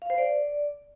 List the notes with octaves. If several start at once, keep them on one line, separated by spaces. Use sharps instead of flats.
F5
C5
D5